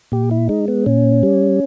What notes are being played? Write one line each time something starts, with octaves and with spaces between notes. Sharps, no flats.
A#2 G4
E4
G#3 D#4
B3
A#2 C#4
G3